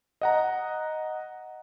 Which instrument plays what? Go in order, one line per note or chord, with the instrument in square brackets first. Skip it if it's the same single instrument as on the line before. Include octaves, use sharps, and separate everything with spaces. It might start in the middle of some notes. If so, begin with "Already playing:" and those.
[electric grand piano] D#5 F#5 A#5